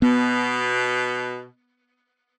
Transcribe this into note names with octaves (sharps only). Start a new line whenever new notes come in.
B2 B3